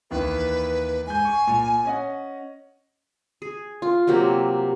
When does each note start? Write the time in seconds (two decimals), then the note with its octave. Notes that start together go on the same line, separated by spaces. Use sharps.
0.11 D#2 D#3 E3 B4
1.07 G#2 G#5 G6
1.25 C#6
1.47 A#2
1.85 C#4 D#5 F#5
3.42 G#4
3.82 F4
4.07 C3 F#3 A#3 G4